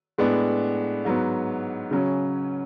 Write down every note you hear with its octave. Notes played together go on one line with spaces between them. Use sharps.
A2 G#3 B3 D4
G#2 F#3 B3
C#3 F#3 C#4